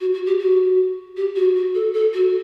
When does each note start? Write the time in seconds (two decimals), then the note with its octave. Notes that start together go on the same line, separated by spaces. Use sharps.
0.01 F#4
0.14 F#4
0.26 G4
0.39 F#4
1.17 G4
1.36 F#4
1.56 F#4
1.75 A4
1.94 A4
2.13 F#4